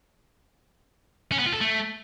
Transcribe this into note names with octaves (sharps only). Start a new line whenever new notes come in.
C#4
B3
F4
A4
A3